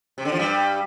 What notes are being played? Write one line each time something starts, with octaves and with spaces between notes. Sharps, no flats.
C3
D3
F3
G2 G3